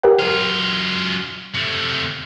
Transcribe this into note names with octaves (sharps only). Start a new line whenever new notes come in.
G4 A#4 F#5
F#2 F4 D#7
C3 A3